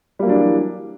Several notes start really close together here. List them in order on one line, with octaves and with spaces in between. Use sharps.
G3 A#3 F#3 D4 E3